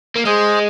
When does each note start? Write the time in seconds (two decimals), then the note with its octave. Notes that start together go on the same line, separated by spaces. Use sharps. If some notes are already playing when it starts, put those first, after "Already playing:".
0.16 A#3
0.25 G#3 G#4 C5